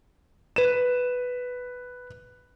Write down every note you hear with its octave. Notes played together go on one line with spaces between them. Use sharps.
B4 D#7 E7